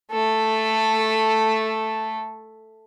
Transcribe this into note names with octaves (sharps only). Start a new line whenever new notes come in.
A3 A4